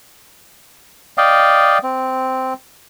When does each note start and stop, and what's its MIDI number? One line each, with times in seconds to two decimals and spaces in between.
1.18 1.78 74
1.18 1.78 75
1.18 1.78 77
1.18 1.78 79
1.83 2.53 60